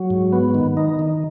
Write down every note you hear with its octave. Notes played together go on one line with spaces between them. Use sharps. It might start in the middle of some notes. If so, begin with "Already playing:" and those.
Already playing: F#3
G#2
B3
D#3
D#4
D#3